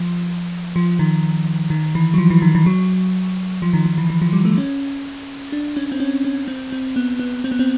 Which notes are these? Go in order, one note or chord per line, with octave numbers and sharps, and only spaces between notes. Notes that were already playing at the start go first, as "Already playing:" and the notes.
Already playing: F3
F3
D#3
D#3
E3
F#3
F3
E3
D#3
E3
F#3
F3
D#3
D#3
E3
E3
F3
G3
A3
C#4
D4
C#4
C4
C#4
C#4
C4
C4
B3
B3
C4
B3
C4